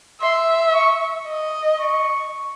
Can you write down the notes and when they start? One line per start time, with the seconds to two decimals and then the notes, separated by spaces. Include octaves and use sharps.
0.21 E5 C6
0.73 C#6
1.26 D#5
1.80 C#6